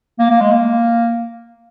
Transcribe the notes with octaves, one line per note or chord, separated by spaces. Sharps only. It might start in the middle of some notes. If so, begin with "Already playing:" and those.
A#3
A#3
G#3
A#3